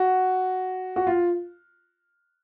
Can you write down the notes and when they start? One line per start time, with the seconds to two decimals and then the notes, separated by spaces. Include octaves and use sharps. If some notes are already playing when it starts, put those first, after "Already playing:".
Already playing: F#4
0.96 F#4
1.07 F4